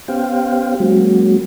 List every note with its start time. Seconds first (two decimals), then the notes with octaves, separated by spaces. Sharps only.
0.08 B3 C#4 G4 C5 F5 G5
0.80 F#3 G#3 A#3 C#4 F#4